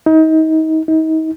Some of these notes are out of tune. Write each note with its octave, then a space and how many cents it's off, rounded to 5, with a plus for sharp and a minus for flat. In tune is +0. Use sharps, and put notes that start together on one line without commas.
D#4 +30
D#4 +35